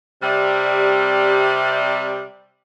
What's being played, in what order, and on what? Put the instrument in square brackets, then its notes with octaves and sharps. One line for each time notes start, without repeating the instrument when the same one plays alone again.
[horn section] C3 G3